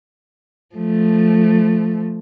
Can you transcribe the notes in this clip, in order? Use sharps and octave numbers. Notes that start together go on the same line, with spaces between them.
F3 A3